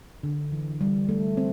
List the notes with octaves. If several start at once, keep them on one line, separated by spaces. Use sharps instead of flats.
D3
E3
G3
A3
C4